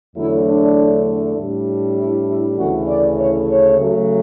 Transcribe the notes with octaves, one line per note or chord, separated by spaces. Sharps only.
E2 D3 F#3 A3 E4
D4
A2 G3 D4
E4
E4
D2 C#3 E3 A3 C#4 F#4
D5
C#5
C#5
C#3 F#3 A3